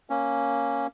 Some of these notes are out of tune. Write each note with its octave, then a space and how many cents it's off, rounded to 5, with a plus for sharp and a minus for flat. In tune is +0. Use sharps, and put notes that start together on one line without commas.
A#3 +0 C#4 +0